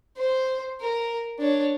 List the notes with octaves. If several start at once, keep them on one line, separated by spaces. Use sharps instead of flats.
C5
A#4
D4 C#5